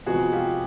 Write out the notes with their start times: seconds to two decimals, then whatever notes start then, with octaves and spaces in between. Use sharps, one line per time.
0.06 C3 F3 G#3 B3 F#4 G#4
0.32 F4 G4